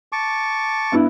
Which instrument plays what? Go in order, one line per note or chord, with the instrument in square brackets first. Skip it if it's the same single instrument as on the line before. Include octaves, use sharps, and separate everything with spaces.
[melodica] A5 C#6 D6
[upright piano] G2 B3 E4